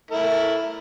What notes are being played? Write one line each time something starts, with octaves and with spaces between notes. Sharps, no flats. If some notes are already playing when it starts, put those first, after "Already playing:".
A3 E4 A#4